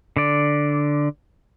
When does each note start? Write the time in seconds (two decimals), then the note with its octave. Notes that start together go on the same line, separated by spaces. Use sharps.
0.17 D3 D5